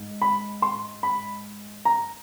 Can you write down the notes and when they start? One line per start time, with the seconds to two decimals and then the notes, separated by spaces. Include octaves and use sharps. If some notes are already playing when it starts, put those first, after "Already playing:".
Already playing: G#2
0.22 B5
0.62 C6
1.03 B5
1.85 A#5